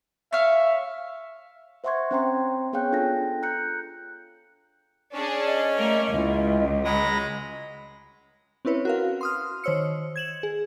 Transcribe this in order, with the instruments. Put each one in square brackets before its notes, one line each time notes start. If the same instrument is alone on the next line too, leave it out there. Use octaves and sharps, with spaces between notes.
[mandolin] C#5 F5 [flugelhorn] E5
[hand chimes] C5 E5 F#5 C6 C#6 G#6
C4 C#4 C5 G5 A#5 C6
B3 G#4 C#5 F5 G5 F#6
D4 F4 A4 G5 A#6
A#5 F#6 G6 C#7
[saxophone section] C#4 [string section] D4 G#4
[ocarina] D#5
[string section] A3 A#3 A#4
[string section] C#2 [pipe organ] G#3 E4 F4
[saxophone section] C#3 F#3 G#3 [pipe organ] A#5 B5 A#6
[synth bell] C4 C#4 E4 B4 C#5
F#4 A#4 F5
C6 D#6 F6
D#3 C5 C#5 E6 C#7
G#6 E7 F#7
G#4